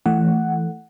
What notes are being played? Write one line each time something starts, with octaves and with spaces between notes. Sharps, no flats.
E3 A3 F#5